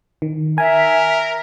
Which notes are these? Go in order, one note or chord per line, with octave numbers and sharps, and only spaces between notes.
D#3
A#4 E5 G#5